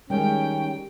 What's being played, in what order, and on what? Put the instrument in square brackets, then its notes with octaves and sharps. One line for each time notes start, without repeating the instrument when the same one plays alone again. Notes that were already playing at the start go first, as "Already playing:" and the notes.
[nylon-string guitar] D#3 G#3 [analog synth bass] G3 [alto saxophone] C#4 [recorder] G5